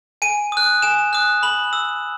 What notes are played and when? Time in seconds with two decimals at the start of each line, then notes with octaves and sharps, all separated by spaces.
0.22 G#5 D#7
0.52 D#6 F#6
0.82 G#5 E7
1.13 D#6 F#6
1.43 B5 F#7
1.73 E6